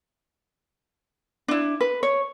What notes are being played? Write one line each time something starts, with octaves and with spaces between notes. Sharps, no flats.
D4 E4
B4
C#5